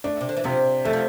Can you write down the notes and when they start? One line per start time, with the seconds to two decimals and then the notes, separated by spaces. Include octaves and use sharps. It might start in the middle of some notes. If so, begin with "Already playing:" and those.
0.04 A3 D4
0.21 C3
0.29 D3
0.36 E3
0.44 C3 F3
0.85 E3 A3
0.93 F3